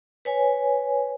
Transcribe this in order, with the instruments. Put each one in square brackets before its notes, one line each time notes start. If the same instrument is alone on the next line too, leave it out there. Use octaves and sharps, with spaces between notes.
[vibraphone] B4 C#5 G#5